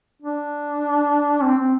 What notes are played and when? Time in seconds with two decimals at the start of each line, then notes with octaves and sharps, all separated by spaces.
0.22 D4
1.43 C4
1.58 C4